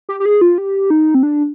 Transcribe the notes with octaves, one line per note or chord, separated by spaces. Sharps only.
G4
G4
G#4
F4
G4
D#4
C4
D4